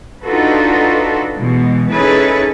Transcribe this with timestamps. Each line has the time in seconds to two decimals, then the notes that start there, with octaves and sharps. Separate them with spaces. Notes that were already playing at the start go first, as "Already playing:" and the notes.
0.24 D4 D#4 F4 F#4 A4 B4
1.36 B2 E3 G#3
1.91 C#4 D#4 E4 G#4 A4 B4